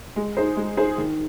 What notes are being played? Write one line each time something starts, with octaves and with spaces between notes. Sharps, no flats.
G#3
D#4 G#4 C5
G#3
D#4 G#4 C5
D#3